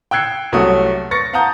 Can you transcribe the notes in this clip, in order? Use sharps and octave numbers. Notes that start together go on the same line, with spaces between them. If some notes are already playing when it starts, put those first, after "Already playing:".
G5 E6 F#6 G#6 C7 C#7
C2 F#3 A3 C#4 F#4 D#6
C#6 A6 A#6 C#7
F5 F#5 A5 A#5 D#6 G6